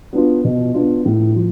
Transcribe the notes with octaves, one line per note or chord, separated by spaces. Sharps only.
B3 D4 F4
B2
B3 D4 F4
A2
F3